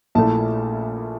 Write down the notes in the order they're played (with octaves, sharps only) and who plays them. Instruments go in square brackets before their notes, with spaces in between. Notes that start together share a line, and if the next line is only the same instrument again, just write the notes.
[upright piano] A#1 A#2 A3 E4 A5